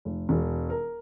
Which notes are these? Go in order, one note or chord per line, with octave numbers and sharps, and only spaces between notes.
F1
E1
A#4